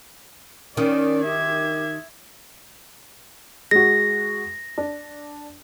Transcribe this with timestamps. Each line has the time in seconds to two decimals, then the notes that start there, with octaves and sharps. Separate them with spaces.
0.77 D#3 C#4 D5
1.25 G4 E5 G#6
3.71 G#3 F#4 A#6
4.78 D4